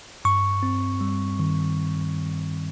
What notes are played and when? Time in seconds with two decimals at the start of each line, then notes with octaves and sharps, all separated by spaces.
0.25 G2 C#6
0.63 C4
1.01 G3
1.39 D#3